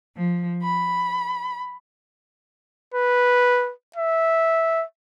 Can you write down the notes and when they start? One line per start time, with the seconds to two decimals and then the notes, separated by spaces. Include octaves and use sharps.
0.16 F3
0.62 B5
2.94 B4
3.96 E5